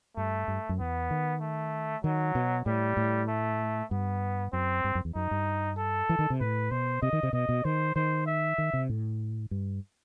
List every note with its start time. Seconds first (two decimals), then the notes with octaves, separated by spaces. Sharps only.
0.17 G2 A3
0.48 G2
0.69 F#2
0.79 E2 B3
1.11 D#3
1.41 A3
2.04 D#3 F#3
2.35 B2
2.66 A2 G3
2.97 A2
3.28 A3
3.91 G2 B3
4.53 F#2 C4
4.84 G2
4.95 F#2
5.05 E2
5.15 F#2 D#4
5.31 G2
5.77 A4
6.09 E3
6.19 D#3
6.30 C3
6.40 A2 B4
6.71 B2 C5
7.02 C3 D#5
7.13 D#3
7.23 C3
7.33 B2 D#5
7.49 B2
7.65 D#3 C5
7.95 D#3 C5
8.26 E5
8.58 D#3
8.73 C3
8.89 A2
9.51 G2